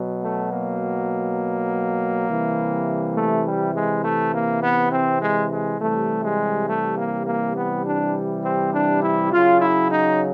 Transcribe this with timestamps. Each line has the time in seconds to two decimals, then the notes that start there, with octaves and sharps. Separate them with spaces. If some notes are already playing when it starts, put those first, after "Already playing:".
Already playing: B2 F#3
0.23 A3
0.53 A#3
2.29 C3 E3 G3
3.16 A3
3.46 G3
3.75 G#3
4.05 A3
4.34 A#3
4.63 B3
4.92 C4
5.22 G#3
5.51 G#3
5.80 C3 E3 G3 A3
6.24 G#3
6.69 A3
6.98 A#3
7.27 A#3
7.57 B3
7.86 D4
8.45 C4
8.74 D4
9.03 E4
9.33 C#3 F#3 F4
9.61 E4
9.91 D#4